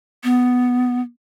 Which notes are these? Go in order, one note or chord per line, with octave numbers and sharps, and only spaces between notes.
B3